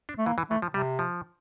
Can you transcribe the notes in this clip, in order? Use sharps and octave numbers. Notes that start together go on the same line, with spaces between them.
D4
A3
E3 A#3
E3
E3 A3
F3
C3 G3
F3